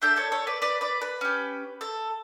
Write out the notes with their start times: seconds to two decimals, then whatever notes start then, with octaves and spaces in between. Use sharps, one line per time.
0.02 D4 A4 E5 G5
0.16 A4 C#5
0.32 A4 C#5
0.47 B4 D5
0.62 B4 D5
0.81 B4 D5
1.01 B4
1.21 C#4 G4
1.81 A4